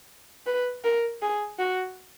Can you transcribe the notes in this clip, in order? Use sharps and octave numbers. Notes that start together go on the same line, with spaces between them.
B4
A#4
G#4
F#4